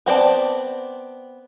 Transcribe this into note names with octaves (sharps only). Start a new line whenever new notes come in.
B3 C4 C5 D5 A5